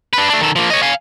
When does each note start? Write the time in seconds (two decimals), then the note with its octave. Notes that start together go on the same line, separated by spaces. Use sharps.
0.13 D4 B4
0.30 A3 D4
0.41 D#3 A4
0.56 F3 A#3
0.70 C#5 D#5
0.83 F5 G#5